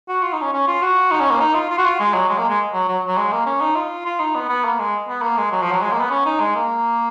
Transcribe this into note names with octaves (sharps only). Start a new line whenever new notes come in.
F#4
F4
D#4
C#4
C#4
F4
F#4
D#4
C#4
A#3
D#4
F4
F4
F#4
F4
G#3
F#3
G#3
A#3
G#3
F#3
F#3
F#3
G#3
A#3
C#4
D#4
F4
F4
D#4
B3
B3
A#3
G#3
B3
A#3
G#3
F#3
F3
F#3
G#3
A#3
B3
C#4
D#4
G#3
A#3